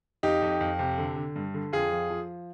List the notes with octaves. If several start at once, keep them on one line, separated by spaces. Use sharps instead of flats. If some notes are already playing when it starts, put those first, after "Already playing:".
F2 D#4 G4
F2
F2
C3
D3
D3
G2
D3
F2 F4 G#4
F3
F3